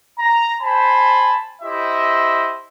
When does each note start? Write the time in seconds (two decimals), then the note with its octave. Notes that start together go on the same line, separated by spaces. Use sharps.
0.19 A#5
0.60 C5 G#5 A5 B5
1.61 E4 G4 C5 D#5 E5